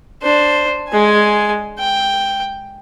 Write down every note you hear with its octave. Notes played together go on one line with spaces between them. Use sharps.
D4 C5
G#3 G#5
G5